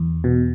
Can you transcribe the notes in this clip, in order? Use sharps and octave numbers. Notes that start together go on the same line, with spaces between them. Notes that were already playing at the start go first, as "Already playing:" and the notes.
Already playing: E2
B2